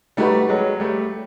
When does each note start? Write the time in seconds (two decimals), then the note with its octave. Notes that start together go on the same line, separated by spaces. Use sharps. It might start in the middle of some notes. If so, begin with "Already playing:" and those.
0.17 G3 A3 D#4 F#4 B4
0.49 F#3 G#3
0.80 G3 A3